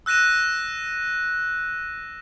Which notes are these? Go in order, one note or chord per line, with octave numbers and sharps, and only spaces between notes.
E6 F#6 A#6 D#7 E7